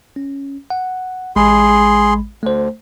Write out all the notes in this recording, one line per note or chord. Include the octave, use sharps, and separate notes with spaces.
C#4
F#5
A1 G#3 G#4 B5 C6
D2 A3 C5